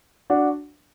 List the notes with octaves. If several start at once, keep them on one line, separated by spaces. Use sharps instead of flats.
D4 F#4